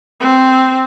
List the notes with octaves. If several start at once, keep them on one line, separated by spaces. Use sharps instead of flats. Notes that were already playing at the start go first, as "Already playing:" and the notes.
C4